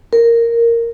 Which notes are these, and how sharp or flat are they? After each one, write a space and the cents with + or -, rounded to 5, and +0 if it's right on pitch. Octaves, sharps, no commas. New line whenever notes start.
A#4 -5